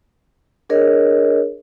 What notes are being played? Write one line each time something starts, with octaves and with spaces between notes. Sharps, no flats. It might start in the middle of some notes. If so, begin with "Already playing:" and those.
D4 G#4 A#4 C#5 D#5